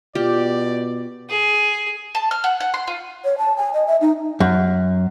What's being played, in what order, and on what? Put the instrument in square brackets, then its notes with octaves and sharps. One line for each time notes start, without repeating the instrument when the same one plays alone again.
[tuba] B2 [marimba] F4 [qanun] G4 [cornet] D5
[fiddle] G#4
[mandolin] A5
F6
F#5
F#5
C6
F4
[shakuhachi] C#5
A5
G#5
D#5
E5
D#4
[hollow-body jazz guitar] F#2